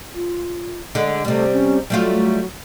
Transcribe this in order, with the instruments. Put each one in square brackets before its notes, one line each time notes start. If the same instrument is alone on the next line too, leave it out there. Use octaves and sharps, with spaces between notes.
[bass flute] F4
[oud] D3 G#3
[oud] C3 G3 [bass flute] A3
[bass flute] C#4
[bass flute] F#3 [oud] G3 A3 F4